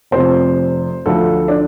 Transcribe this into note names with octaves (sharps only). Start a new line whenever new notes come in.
F1 F2 C3 C5
D2 D3 F3 A4
D4